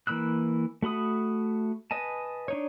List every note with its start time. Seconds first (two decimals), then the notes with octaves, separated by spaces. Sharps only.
0.07 E3 A#3 B5 E6 F#6
0.82 A3 F#4 B5 D#6
1.91 B4 D#5 G#5 A5
2.48 D4 D#4 C#5